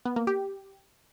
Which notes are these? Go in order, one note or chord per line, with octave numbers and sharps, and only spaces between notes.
B3
A#3
G4